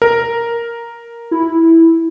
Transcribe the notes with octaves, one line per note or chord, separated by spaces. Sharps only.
A#4
E4